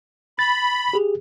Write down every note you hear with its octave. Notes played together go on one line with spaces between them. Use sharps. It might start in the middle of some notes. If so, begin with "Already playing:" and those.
B5 A6
G4 G#4